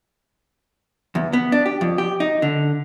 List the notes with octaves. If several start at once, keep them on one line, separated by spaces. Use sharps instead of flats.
E2
B3
D4
G4
F2
G4
D#4
D3